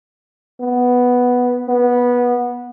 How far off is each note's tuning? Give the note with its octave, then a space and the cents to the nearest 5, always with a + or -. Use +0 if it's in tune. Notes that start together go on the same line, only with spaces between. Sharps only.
B3 +0
B3 -15